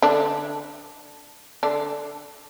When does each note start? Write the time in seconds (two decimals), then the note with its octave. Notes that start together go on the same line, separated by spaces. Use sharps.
0.02 D3 D4
1.63 D3 D4